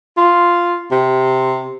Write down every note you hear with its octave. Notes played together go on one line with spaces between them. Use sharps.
F4
C3